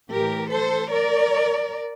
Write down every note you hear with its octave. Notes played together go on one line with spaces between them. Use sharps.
A2 E3 G4 A#4
A4 C5
A#4 D5